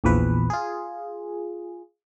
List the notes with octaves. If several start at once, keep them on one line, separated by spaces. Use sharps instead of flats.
A#1 E2 F3 B4
F4 G#4